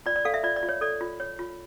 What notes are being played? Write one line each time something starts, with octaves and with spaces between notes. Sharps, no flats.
F4 D5
D5
A4 F5
E5
F4 D5
D5
F4
C#5
A4 D5
F4
C#5
F4